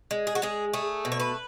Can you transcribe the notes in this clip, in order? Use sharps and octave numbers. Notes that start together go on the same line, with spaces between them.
G#3
G#4
F#4
G#3 G#4
A3 G#4
B2
C#5
B4